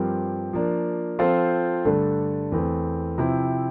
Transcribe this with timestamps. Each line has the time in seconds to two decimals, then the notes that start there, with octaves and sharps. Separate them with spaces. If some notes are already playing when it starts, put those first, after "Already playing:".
Already playing: G2 F3 C4 G4 A#4
0.53 F3 A#3 D4
1.19 F3 C4 F4 A4 C5
1.85 G2 D3 A3 D4 A4
2.52 E2 E3 A3 C4
3.18 C3 F3 C4 E4